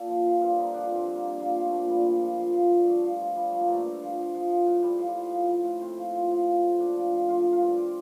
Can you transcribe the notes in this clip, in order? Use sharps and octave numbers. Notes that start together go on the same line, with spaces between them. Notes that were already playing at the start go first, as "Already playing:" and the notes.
Already playing: A#2 A4
F3
F3
G2 F4
D3 D#4
F3 D4
G2 C4
G2
A#3
D3
F3 A#3
F3
A3
A#2
A#2 G3
F3
F3
F3
F3
G2
G2 A3
F3
F3
F3 G3
F3 A3
A#3
G2 A3
G2 A3
F3
F3
F3
F3
A2
A2 G3
F3
G3
F3
F3
F3
A2
A2 C4
F3
F3
F3
F3
A2
A2 D4
F3
F3
F3 F4
F3
F4
G2
G4